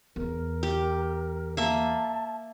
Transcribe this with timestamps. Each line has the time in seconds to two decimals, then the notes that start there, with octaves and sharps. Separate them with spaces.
0.16 E2 A#4
0.63 G4
1.57 A#3 E5 A5